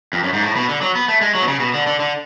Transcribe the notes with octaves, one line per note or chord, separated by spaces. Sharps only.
F2
F#2
G#2
A2
B2
D3
F#3
B3
A3
G#3
F#3
B2
C#3
B2
D3
D3
D3